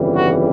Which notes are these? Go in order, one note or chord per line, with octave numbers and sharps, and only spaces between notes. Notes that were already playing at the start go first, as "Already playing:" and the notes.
Already playing: G1 F2 C#3 E3 G3
F#4